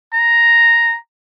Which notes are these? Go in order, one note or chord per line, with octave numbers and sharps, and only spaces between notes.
A#5